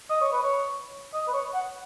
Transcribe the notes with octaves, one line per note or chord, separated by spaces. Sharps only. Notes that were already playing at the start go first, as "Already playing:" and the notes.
D#5
C#5
B4
C#5
D#5
B4
C#5
F#5